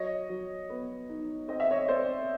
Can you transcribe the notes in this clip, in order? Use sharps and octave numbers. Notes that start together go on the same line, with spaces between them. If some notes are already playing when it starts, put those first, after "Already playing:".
Already playing: F#3 C#5 D#5
F#3
B3
D#4
C4 D#5
E5
C#5 D#5
C4 C5 D5